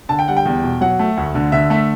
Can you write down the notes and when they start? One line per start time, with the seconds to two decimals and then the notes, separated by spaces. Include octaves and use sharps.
0.09 D3 A5
0.19 G5
0.28 G3 F#5
0.37 G5
0.45 E2
0.63 B2
0.81 F#3 F#5
0.99 A3
1.17 D2
1.35 D3
1.52 D3 E5
1.70 A3 E5